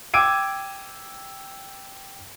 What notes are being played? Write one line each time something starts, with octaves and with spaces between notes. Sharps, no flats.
G5 D6 E6 G#6 D7 D#7